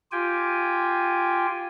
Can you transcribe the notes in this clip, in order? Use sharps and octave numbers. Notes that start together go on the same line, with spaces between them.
F4 G4 G5 G#5